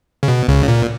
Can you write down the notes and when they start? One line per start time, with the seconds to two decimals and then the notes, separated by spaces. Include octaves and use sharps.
0.23 C#3
0.28 B2
0.48 C#2 C#3
0.68 A#2